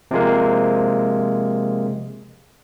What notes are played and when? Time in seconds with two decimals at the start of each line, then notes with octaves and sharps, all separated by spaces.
0.11 C3 F3 G#3 A#3